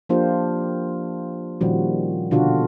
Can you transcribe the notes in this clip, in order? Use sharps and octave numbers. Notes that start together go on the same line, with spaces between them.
F3 A#3 D4 F4 G4 C5
A#2 D#3 F3 G3 C#4 F#4
B2 D3 D4 F4 F#4